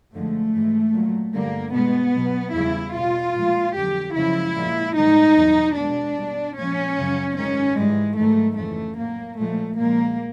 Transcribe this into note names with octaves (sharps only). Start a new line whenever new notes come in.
F#2 D3 F3 G#3 A3
G#2 E3 G#3
A#2 F#3
G2 D3 G3 A#3
B2 G#3 B3
B2 F#3
E2 C#3 E3 G3 E4
B2 G3 F4
A#2 F3 G#3
F2 D3 F#3 G4
F#2 C#3 F3 G#3 E4
A#2 F3 G#3
G#2 D#3 G3 D#4
E2 B2 F#3
B2 G#3 D4
B2 G3
A#2 F3 G#3 C#4
F#2 C#3 F#3
G#2 D#3 G#3 C#4
G#2 E3 G3 G#3
G#2 D#3 F#3 A3
F2 C#3 E3 A3
A2 F#3 A#3
A#2 F3 G#3 A3
A#2 F3 G#3 A#3